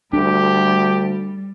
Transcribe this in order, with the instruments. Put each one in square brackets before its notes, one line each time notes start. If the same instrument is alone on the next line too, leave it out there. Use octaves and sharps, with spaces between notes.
[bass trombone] D2 [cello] G3 [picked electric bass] D4 [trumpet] G4